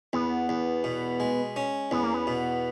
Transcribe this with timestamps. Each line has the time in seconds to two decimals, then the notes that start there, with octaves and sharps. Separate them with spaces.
0.13 E2 B3
0.49 E2
0.84 B2
1.20 G#3
1.56 C#4
1.91 E2 B3
2.03 A#3
2.14 B3
2.27 B2